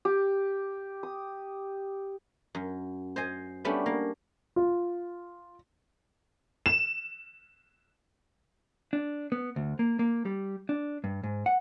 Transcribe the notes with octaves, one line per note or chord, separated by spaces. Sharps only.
G4
D#6
F#2
C5 D#5 G#5
G3 A3 B3 C#4 D4
A#3
F4
E7
D4
B3
D2
A#3
A#3
G3
D4
G2
G#2
F#5